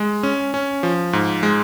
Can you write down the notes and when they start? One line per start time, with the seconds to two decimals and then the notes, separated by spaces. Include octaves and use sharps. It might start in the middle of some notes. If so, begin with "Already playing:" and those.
Already playing: G#3
0.23 C#4
0.54 C#4
0.83 F3
1.13 G#2
1.43 G#3